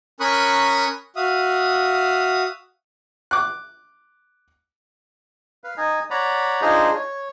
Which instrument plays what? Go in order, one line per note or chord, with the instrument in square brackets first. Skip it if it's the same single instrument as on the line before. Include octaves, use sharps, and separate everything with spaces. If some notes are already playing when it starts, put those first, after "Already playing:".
[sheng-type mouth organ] C#4 A#4 B5 C#6 D#6 F#6
F#4 E5 F5 D#6
[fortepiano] D6 F#6
[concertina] B4 F5
D#4 D#5 G#5
C#5 D5 F#5 A#5 B5
D4 D#4 F4 G#4 C5 D#5
C#5